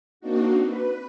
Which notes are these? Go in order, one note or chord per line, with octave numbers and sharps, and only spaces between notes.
A#3 C4 D4 D#4 F#4
B4